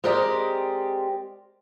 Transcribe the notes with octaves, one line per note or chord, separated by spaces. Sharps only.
G#3 C4 G4 A#4 D5 D#5